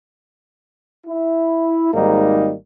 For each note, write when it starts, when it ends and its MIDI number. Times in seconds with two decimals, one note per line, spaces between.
1.07 1.91 64
1.94 2.55 32
1.94 2.55 44
1.94 2.55 55
1.94 2.55 58
1.94 2.55 63